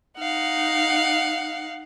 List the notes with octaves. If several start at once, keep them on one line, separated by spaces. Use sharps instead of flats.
D#4 F5 F#5